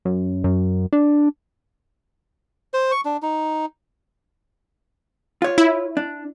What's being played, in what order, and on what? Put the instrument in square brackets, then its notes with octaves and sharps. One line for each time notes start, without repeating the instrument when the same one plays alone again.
[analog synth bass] F#2
F#2
D4
[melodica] C5
C#6
D4
D#4
[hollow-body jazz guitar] F4 C#5
[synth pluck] E4
[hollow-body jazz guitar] D4